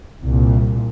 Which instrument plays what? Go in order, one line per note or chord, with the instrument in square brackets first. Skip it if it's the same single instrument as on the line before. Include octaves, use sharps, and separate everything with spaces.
[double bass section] C2 A#2